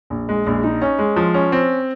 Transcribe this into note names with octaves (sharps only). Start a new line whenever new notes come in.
A#1
G#3
A#1
D#4
C#4
G#3
F3
C#4
C4